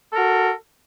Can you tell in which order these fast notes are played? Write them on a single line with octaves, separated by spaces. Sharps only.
A4 A#4 F#4